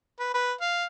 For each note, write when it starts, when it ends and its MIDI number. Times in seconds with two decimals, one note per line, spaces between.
0.19 0.32 71
0.34 0.52 71
0.61 0.85 77